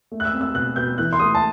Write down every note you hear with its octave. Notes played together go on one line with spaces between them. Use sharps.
A3
F#6
E6
C4
E6
B2 F#6
B2 G6
E3 F#6
C6
A3 D#6
A5